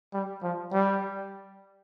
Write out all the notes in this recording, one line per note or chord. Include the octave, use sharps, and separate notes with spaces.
G3
F3
G3